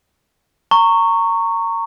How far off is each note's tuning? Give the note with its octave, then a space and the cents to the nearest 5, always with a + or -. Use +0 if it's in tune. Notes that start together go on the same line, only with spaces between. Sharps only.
A#5 -25 C#6 +0